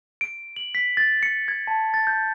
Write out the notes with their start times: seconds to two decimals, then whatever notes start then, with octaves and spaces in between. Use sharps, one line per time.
0.21 D7
0.56 F#7
0.75 B6
0.97 A6
1.23 C#7
1.48 G#6
1.67 A5
1.94 A6
2.07 G6